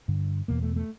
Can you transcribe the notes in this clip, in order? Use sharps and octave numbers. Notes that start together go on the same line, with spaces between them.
G2 D3
E2 B2 A#3
A3
A3